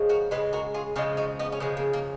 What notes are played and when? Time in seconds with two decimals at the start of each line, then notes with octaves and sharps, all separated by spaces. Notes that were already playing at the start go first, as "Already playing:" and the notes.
Already playing: C#3 F3 G#3
0.09 F#4 A#4
0.31 C#3 F3 G#3 G#4 B4
0.53 F#4 A#4
0.74 F4 G#4
0.96 C#3 F3 G#3 F4 G#4
1.17 D#4 F#4
1.39 B3 D#4
1.52 C#4
1.60 C#3 F3 G#3 B3
1.77 A#3
1.93 A#3